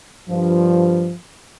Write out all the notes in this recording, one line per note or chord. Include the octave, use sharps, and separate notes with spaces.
G2 F3